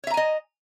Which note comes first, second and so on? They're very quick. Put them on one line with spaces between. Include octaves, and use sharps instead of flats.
C#5 E5 A#5 G#5 D#5